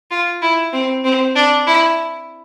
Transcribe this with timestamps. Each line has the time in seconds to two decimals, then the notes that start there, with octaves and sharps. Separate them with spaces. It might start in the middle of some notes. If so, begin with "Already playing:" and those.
0.11 F4
0.42 E4
0.73 C4
1.04 C4
1.36 D4
1.67 E4